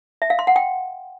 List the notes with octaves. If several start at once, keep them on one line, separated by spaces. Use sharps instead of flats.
E5
F5
C6
F#5
G5